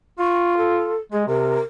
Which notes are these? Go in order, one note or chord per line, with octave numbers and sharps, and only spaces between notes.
F4 C#6
A4
G#3 G#4
C3 A#4